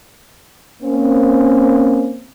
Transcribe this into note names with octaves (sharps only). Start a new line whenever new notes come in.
A#3 C4 C#4